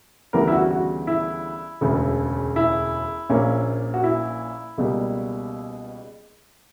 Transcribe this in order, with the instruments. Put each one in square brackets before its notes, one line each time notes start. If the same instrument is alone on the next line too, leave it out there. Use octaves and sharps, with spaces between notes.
[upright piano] D2 C#3 E3 G3 B3 A#4
E4
F#4
F#4
E4
E1 D2 C#3
E4
A#1 A#2 A#3 C#4
F#4
E4
C#2 B2 G3 A#3